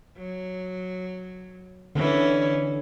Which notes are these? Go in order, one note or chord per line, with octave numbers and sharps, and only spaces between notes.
F#3
D3 E3 C#4